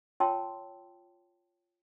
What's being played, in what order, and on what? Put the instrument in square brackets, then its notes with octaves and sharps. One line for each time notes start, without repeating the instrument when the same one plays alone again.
[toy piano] F4 C#5 G5 A5 C6 E6